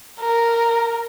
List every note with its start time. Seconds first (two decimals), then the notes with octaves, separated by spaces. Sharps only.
0.20 A#4